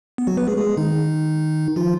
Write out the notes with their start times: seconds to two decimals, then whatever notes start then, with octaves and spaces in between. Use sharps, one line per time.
0.18 B3
0.27 F#3 F#4
0.37 B3 B4
0.47 G#3 G#4
0.58 G#3 G#4
0.77 D#3 D#4
1.76 F3 F4